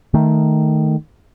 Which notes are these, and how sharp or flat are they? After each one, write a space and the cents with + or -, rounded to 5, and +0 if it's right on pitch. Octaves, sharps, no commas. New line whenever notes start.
D#3 +0 A3 +0